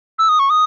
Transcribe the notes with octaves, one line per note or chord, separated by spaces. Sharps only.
E6
D#6
C#6
D#6